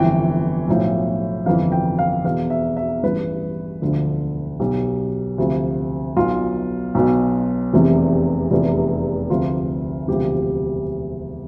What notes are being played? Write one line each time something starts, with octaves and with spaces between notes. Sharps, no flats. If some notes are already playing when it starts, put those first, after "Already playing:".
Already playing: G1 F2 E3 G5
B1 A2 F3
G1 F2 E3 F5
G5
F5
E2 B2 F5
E5
E5
A1 G2 E3 B4
E1 D2 D3 F3
B1 B2 G4
D2 C3 F3
B1 B2 F4
B1 B2
F1 E2 C3 E3
F1 E2 C3
D2 C3 F3 F4
E1 D2 C3 F3 G4